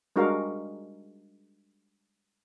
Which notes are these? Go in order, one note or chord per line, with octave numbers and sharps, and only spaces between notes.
G3 G#3 D4 F#4 A#4 F5